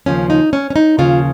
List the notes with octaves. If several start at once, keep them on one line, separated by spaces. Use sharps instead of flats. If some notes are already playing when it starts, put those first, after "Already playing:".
D#2 C#3 F3 A#3 C#4
D#4
C#4
C#4
D#4
D#2 C#3 F3 A#3 F4